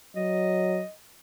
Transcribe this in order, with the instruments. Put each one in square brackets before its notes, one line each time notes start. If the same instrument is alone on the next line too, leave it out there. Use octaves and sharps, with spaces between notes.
[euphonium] F#3 [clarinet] D#5